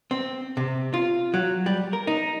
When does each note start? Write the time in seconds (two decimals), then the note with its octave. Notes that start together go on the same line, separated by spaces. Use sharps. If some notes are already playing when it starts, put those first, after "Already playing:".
0.11 C4
0.57 C3
0.94 F4
1.34 F#3
1.66 G3
1.93 A#4
2.07 D#4